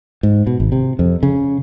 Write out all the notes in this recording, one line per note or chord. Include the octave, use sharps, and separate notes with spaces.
G#2
B2
G#1
C3
F2
C#3